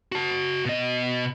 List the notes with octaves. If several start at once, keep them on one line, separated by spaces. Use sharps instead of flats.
F#4 A5
B2 D#5